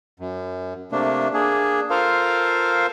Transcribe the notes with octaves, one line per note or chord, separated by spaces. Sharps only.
F#2
C3 A3 A#3 D4
A#3 D4 G#4
F4 A4 A#4 C5 F5